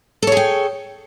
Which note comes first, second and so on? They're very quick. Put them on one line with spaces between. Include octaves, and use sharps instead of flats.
A4 C#5 G#4 G5